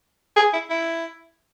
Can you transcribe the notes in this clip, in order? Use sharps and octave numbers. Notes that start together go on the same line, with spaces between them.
G#4
E4
E4